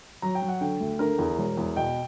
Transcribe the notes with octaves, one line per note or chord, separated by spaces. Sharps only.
F#3 A#5
G5
F#3
F#5
D3 G5
D2
D3 A#4 A#5
E2
E1
E2
B2 G5